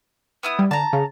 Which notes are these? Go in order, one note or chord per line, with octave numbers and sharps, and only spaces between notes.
B3 E4 D#6
G3
D3 A5 A#5
C#3